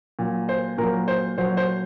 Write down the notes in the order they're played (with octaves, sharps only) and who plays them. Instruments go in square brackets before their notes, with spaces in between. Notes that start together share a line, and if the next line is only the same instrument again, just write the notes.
[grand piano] A#2 F#3
C5
A#2 F#3 A#4
C5
A#2 F#3 C5
C5